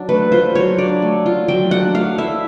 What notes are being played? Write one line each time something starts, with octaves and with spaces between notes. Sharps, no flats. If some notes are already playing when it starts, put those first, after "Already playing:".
Already playing: F#3 D4
A3 B4
F4 C5
F#3 C#5
D4 D5
A3
F4
F#3 G5
D4 F#5
A3 F5
E4 E5